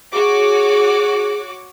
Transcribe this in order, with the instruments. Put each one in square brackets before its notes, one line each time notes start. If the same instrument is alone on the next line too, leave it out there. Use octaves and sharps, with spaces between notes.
[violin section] F#4 C#5 D6 [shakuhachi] G#4